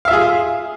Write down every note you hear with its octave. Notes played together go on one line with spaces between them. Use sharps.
F4 G#4 E5 F5